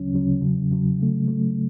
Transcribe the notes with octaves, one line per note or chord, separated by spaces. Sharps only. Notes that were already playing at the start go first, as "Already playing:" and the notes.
Already playing: D2 C#3 F#3 C#4
D2 C#3 F#3 C#4
E2 C#3 F#3
E2 C#3 F#3
C#3 F#3 A3
C#3 F#3 A3